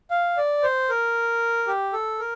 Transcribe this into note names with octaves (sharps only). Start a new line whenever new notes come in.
F5
D5
C5
A#4
G4
A4
A#4